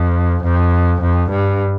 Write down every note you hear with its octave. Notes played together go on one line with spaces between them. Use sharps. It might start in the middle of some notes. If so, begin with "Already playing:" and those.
Already playing: F2
F2
F2
G2